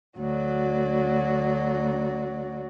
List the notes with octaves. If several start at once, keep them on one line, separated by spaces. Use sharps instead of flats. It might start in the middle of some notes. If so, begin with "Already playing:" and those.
D2 F#3 F#4 D5